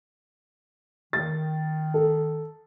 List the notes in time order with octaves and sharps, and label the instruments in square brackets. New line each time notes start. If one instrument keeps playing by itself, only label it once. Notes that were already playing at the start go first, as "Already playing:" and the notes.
[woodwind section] D#3 [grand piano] A6
[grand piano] A4